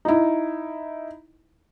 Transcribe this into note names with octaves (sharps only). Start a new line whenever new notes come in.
D#4 E4